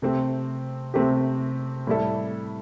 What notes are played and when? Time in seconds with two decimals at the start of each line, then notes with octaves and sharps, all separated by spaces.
0.02 C3 A3 C4 G4
0.94 C3 A3 C4 G4
1.87 A2 G3 E4 A4